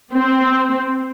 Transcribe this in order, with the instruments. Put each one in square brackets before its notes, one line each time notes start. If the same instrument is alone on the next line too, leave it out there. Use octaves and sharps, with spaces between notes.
[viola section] C4